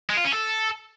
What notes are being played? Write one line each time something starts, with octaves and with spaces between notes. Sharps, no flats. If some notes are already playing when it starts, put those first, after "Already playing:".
G#3
F4
C#4
A4